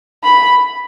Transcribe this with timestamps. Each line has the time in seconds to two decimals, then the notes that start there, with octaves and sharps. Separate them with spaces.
0.24 B5